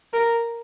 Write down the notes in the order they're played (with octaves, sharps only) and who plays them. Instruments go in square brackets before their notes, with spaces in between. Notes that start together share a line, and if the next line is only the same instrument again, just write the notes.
[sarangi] A#4